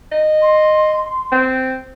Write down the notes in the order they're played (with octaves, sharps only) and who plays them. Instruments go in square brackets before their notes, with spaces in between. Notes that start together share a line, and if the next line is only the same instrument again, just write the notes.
[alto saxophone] D#5
[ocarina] C6
[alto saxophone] C4